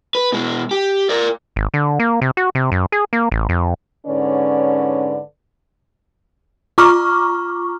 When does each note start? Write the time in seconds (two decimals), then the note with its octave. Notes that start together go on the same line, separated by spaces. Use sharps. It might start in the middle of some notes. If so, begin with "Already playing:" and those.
0.15 B4
0.32 B2 G#3
0.71 G4
1.09 A#4 D5
1.56 G#1
1.74 D3
1.99 A#3
2.22 C3
2.37 F#4
2.55 C3
2.72 F#2
2.92 G#4
3.13 A#3
3.32 A1
3.49 F2
4.07 G#2 D3 C#4 B4 C#5 D5
6.78 F4 A#5 C#6 D6 F6